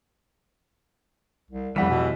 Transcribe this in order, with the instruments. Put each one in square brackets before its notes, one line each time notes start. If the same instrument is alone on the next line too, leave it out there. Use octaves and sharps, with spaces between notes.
[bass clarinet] C2
[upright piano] F1 F#5 B6 [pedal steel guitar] E3 [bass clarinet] G3
[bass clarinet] B2